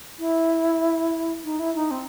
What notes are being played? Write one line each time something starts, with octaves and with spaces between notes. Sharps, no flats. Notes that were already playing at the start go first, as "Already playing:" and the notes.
E4
D#4
E4
D#4
C4